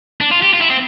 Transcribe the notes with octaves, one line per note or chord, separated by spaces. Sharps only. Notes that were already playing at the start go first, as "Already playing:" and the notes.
D4
F4
G4
F4
E4
C4